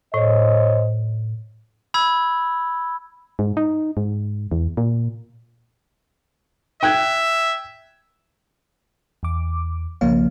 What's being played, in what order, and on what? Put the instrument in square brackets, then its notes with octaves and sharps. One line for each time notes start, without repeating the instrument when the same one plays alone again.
[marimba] A2 [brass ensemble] C5 C#5 D#5
[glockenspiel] B5 E6 G#6
[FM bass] G#2
D#4
G#2
E2
A#2
[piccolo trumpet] E5 [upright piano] G5 F#6 G#6
[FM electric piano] E2 D6
B1 C#3 F3 A#3 C#5 F5